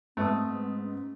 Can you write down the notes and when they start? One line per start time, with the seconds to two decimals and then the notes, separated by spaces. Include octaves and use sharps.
0.17 G#2 A3 B3 C4 D#6
0.82 C#4